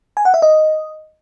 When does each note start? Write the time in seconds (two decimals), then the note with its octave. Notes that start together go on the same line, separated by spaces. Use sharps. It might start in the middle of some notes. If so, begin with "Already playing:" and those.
0.17 G#5
0.25 F#5
0.34 E5
0.42 D#5